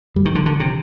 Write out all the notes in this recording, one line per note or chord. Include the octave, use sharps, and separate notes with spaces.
G2 G3
D#3
F3
D3
D3 D#3
C3